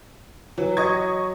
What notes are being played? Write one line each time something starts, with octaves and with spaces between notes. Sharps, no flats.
E3 F#3
D#5 C#6 G#6